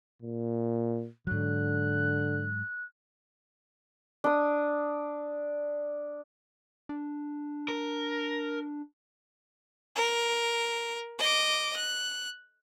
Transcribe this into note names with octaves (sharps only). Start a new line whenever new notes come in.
A#2
G#2 D3 F#3 F#6
D4 D#6
D4
A#4
A#4
D#5 D6
F#6